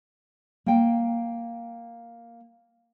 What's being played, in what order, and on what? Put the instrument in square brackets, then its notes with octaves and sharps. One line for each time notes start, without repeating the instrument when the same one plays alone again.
[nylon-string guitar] A#3 G5